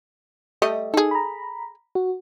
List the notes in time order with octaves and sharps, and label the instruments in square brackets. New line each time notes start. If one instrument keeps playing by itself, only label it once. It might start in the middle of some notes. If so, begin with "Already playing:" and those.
[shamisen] G3 A3 D#5
[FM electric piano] D#4 [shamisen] G#4 A4
[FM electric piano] A#5 B5
F#4